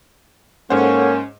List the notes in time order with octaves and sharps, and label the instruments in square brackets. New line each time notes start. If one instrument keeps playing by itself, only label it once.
[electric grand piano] G#2 C5 [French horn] A#3 [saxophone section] C#4 [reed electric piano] A4 C#5 F#5